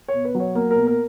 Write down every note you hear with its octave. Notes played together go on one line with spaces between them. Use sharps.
C#5
B2
B4
F#3
C#5
A#3 A#4
A#4
B2
A#4